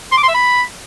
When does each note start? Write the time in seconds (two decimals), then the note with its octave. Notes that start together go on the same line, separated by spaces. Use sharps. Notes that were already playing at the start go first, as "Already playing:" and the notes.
0.12 C6
0.17 D6
0.23 C6
0.29 E5
0.34 B5